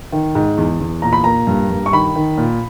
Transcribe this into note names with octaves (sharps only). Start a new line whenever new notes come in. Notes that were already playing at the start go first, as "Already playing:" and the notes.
D#3
G#2
E2
E2
A#2 A#5
B5
A#3 A#5
G2
G2
C#6
D#3 B5
D#3
A#2